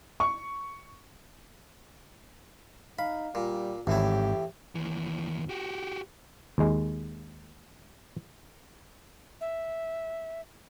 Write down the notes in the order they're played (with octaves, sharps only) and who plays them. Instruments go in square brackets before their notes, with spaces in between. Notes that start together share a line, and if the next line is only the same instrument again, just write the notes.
[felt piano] C#6
[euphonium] D#4 [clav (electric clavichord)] F5 [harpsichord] B5
[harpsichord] A#2 [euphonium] G3
[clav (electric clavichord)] G#1 [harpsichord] E2 A2 E4 [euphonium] G4
[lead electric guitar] D#2 E3
F#4 G4
[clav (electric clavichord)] D#2 G#3
[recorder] E5